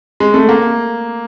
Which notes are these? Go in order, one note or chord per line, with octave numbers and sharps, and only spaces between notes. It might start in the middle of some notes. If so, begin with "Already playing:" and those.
G#3
A3
A#3